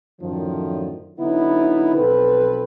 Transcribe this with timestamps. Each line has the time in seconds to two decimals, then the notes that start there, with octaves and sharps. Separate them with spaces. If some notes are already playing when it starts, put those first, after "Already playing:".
0.21 F#2 A2 D3 D#3 F3
1.19 D3 F#3 B3 D#4 E4
1.95 B1 F3 C4 A4 B4